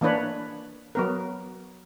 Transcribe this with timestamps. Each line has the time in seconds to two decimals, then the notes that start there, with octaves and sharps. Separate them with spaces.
0.01 E3 A#3 D4 B4 C#5
0.95 F#3 B3 A#4